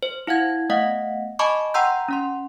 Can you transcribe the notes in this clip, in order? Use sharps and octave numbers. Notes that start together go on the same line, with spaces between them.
C5
E4 F5 F#5 G#6
A3 B3 D#5 F5 F#5 B6
D#5 G#5 A5 B5 C#6 D6
F#5 G5 A#5 C6 E6 G6
C#4 F#5 C6